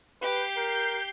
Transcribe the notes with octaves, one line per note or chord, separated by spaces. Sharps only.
G4 B4 G6 C7
A#4